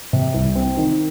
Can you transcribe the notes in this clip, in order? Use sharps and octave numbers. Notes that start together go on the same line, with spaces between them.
C3
C2
C4
D#3